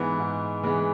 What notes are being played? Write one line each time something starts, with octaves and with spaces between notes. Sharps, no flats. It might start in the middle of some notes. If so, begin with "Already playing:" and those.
Already playing: G#2 E3 G#3 B3
G#2
E3 G#3 B3